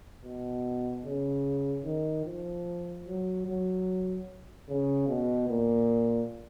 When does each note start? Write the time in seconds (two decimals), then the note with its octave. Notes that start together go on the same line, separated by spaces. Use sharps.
0.25 B2
1.04 C#3
1.85 D#3
2.25 F3
3.06 F#3
3.47 F#3
4.69 C#3
5.08 B2
5.49 A#2